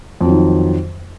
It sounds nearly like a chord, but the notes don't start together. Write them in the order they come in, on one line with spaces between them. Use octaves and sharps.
F2 F#3 D#3